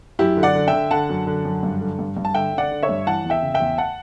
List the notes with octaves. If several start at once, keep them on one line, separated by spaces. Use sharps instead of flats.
F#2 E4 G4
D3
D5 F#5
D3
E5 G5
D3
D3 F#5 A5
F#2
D3
F#2
G2
D3
G2
G2
A5
D3 E5 G5
D3
D5 F#5
D3
C#5 E5
G2
E3 F#5 A5
E2
E5 G5
C#3
E5 G5
E2
F#5 A5